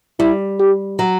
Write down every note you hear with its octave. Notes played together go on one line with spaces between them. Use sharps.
G3 E4
G4
F#3